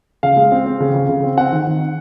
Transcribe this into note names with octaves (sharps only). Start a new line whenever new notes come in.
C#3 F5
G#3
C4
C4
C#3
C#3
C#3
C4
C4 F#5
D#3
D#3